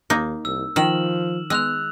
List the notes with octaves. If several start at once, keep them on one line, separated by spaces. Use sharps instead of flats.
D#2 A#3 D#4
C2 E6
D#3 F3 F6 E7 F#7
G#3 B3 E6 F#6 F7